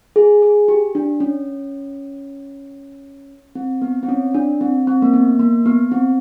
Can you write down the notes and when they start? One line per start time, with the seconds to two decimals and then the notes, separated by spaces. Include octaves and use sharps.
0.16 G#4
0.42 G#4
0.68 G4
0.95 D4
1.20 C#4
3.55 C4
3.82 B3
4.03 C4
4.09 C#4
4.34 D4
4.61 C4
4.87 C4
5.02 A#3
5.14 B3
5.39 A#3
5.66 B3
5.91 C4